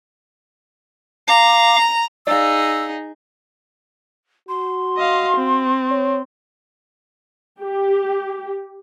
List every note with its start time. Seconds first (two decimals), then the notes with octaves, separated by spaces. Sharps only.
1.28 F5 A#5 D6
2.27 D#4 G#4 D5 F5 E6
4.49 F#4 C6
4.98 D#5 F5
5.37 C4
5.91 C#5
7.60 G4